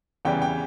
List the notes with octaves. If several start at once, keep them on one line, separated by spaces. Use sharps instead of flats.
E2 C#3 E3 G3 G5
G5